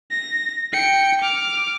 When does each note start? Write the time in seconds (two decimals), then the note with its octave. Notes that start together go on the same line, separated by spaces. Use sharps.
0.11 A#6
0.72 G5 C#7
1.21 D6 F6